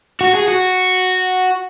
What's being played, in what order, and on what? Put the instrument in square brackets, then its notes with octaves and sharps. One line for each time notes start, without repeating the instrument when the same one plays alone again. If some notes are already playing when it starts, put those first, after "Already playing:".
[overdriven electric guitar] F#4
G#4
F#4